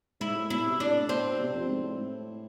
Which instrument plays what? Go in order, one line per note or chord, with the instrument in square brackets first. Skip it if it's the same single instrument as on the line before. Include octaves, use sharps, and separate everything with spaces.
[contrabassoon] G#2 [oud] E4
[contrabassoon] A2
[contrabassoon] B2 [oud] E4
[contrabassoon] C3
[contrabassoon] A2 [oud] D4
[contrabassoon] B2 [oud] C4
[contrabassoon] C3
F2
G#2
A2